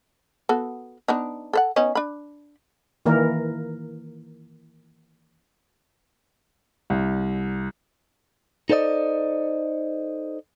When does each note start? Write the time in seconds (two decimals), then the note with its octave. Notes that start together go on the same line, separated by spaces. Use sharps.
0.49 B3 F#4 A4
1.08 B3 D4 D#4
1.53 A4 C5 F#5
1.76 B3 C#4 D#4
1.95 D4 B5
3.06 D#3 E3 A#3 A#4
6.90 C2
8.70 D#4 A4 C5 D5 D#5